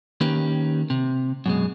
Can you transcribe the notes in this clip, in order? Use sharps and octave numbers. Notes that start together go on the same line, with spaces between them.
D#3 A#3 C#4 G4 B4
C3
F#2 B2 G#3